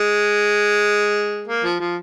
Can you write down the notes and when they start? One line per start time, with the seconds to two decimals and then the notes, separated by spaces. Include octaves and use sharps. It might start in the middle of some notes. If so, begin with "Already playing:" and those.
Already playing: G#3
1.48 A#3
1.64 F3
1.80 F3